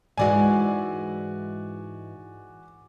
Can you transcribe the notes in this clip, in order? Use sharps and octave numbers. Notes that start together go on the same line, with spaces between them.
G#2 E3 G#3 F#4 D5 G#5